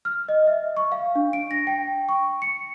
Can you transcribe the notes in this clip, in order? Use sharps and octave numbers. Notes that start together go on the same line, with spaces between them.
F6
D#5
E5
C#6
F5
D4
D7
A#6
G5
C#6
C#7